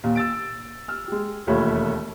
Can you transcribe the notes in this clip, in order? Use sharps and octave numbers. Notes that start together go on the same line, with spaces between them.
D#2 A#2
E6 A6 D7
E6 F6
G#3 G4
E1 D#2 A3 F4 C#5 B5